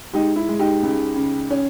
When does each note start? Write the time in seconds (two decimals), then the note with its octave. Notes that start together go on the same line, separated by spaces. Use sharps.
0.13 G#3 D#4 G4
0.36 E4
0.48 G#3
0.59 D#4 G4
0.82 C#2
1.16 C#3
1.50 C#4